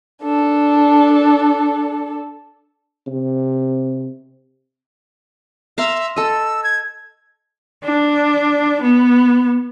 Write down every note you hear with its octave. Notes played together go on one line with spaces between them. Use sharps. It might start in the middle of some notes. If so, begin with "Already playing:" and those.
D4 A4
C3
E5 F5 A#5 C6
A4 D#5 E6
G#6
D4
B3